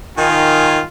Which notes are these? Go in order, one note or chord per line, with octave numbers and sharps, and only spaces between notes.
D#3 F4 G#5